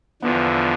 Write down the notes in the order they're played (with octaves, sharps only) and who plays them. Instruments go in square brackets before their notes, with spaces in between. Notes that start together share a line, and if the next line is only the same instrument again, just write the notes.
[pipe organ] E2 D3 F3 [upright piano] B3